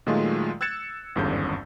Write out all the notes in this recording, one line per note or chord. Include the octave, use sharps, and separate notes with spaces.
A#2 D#3 F#3 G#3 A3 F4
E6 F#6 G#6 A6 C#7 E7
G#1 E2 G2 D3 C#4 G6